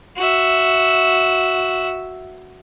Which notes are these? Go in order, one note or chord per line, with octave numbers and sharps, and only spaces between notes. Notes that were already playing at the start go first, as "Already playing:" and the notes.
F#4 E5